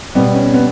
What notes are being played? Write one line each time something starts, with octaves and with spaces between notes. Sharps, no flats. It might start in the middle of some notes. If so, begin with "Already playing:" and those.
B2 G3 B3
C#4
B3